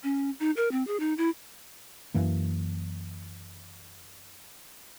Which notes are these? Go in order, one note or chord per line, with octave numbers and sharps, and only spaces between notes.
C#4
D#4
A#4
C4
G#4
D#4
E4
F#2 E3 A#3